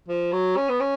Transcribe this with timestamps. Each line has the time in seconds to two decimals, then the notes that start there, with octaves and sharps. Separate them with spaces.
0.09 F3
0.32 F#3
0.57 C#4
0.69 B3
0.80 C#4